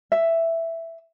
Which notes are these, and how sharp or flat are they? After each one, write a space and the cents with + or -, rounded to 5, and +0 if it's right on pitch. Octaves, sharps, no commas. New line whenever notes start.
E5 +5